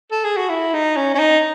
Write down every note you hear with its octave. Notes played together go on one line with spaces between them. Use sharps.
A4
G#4
F#4
E4
D#4
C#4
C#4
D#4